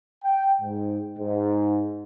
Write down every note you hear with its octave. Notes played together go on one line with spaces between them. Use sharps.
G5
G#2
G#2